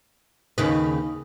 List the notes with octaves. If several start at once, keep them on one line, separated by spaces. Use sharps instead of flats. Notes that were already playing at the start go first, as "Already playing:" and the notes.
D#2 C#3 D#4 B4